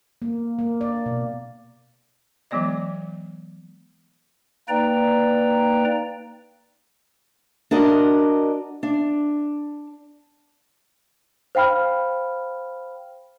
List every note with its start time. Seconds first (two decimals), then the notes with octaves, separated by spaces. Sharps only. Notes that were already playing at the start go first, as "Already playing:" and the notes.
0.22 A#3
0.59 A#3
0.81 D5
1.06 B2
2.51 E3 F#3 G#3 B3 D5 D#5
4.69 A#3 D#4 B4 D5 G5 A#5
7.71 D4 F#4 A#4 D5 D#5
8.83 D4
11.55 C5 F5 G5 B5 F6